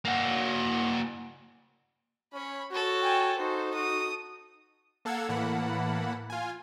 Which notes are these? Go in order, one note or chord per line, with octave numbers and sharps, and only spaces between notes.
A#3 F#4
C#4 C#5 B5
F#4 A4 C#5
G5 G#5
D#4 F#4 A4 C5
F#4 D#6
A#3 A4 F5 F#5 E6 G#6
A2 E3 A#3 F#5 A5 B5
F4 G#5